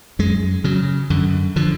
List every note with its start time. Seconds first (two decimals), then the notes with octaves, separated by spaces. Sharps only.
0.19 F#2 G#3
0.64 C#3 F#3
1.10 F#2 D3
1.56 D3 F3